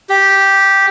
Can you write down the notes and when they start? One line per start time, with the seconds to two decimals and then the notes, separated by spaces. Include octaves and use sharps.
0.09 G4